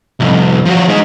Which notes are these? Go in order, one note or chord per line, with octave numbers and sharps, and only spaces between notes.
C2 F2
F3 F#4
G#3 D#4